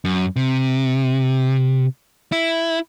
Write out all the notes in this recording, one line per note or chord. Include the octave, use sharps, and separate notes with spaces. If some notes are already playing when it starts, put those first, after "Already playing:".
F#2
C3
E4